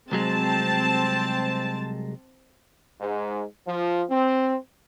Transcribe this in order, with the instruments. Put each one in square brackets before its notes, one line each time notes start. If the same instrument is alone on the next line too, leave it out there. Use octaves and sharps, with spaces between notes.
[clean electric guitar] C2 F#3 G#3 [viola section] C4 A5
[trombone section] G#2
F3
C4